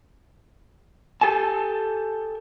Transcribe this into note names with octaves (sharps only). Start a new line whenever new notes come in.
G4 A4 G#5 A5